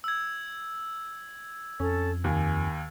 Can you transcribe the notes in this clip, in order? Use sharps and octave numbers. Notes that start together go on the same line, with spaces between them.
E6 G#6
F2 C#4 A4
D#2 G#5